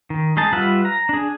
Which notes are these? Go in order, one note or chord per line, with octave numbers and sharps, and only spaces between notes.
D#3
G#3 D#4 A5
G3 F4 B4 E5 F#5
A#5
D4 G#4